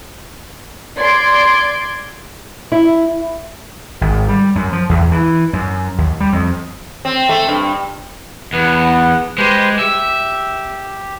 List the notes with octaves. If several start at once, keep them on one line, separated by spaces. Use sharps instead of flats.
D5 C6 G#6 D7
E4
G#1
G3
F#2
F3
E2
E3
F#2
D#2
G3
F2
C4
A3
G2
E2 B3 F#5
G#3 G4 B4 C5
G4 E5